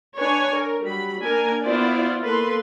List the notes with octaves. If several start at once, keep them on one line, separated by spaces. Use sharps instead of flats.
D4 B4 C#5 G#5
A#4
F#3 G3 B5
A#3 D4 A#4 G#5
B3 E4 F4 C5 D5
A#3 A4 B4 C6